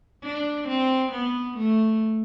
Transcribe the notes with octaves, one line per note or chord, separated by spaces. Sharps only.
D4
C4
B3
A3